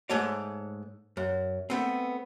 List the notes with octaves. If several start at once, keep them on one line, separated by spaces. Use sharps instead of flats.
G#2 G#3 A3 C#5 D5
F#2
A3 B3 C4